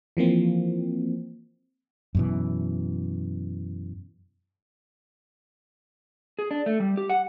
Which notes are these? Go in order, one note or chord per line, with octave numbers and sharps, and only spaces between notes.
E3 F3 A#3 C4
F#2 B2 E3
G#4
D4
A3
G3
G4
F#5